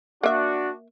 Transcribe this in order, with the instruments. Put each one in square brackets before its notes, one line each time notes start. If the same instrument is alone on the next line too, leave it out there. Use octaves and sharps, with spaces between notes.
[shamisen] A#3 E5 [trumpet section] D4 F#4